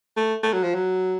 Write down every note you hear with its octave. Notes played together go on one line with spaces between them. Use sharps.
A3
A3
F#3
F3
F#3